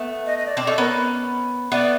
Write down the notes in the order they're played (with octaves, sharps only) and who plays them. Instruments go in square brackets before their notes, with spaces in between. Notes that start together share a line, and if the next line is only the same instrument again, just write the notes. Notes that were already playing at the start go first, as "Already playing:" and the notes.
Already playing: [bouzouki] A3 B3
[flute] D#5
D#5
D5
[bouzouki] C4 D4
[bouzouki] C#4 D#4 [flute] A4
[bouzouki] B3 C#4 [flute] A#4
[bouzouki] A3 B3 [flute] D5